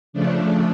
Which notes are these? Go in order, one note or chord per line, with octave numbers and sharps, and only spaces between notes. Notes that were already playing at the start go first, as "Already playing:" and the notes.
C#3 F3 A3 D4